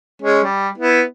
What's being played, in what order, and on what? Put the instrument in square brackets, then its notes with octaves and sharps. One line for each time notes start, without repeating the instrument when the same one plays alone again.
[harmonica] G#3 C#4
G3
B3 E4